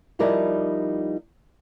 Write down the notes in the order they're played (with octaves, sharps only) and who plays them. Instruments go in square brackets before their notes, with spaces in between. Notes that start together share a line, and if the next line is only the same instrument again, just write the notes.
[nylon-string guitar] F3 G3 D#4 E4 A#4 D5